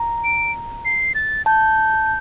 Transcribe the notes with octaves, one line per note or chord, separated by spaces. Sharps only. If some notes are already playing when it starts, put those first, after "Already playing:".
Already playing: A#5
D7
C7
A6
A5 G6